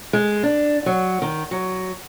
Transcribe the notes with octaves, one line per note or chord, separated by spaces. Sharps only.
G#3
D4
F#3
D#3
F#3